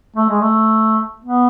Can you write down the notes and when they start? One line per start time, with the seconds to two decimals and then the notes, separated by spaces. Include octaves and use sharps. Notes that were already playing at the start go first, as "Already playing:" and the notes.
0.16 A3
0.29 G#3
0.41 A3
1.24 B3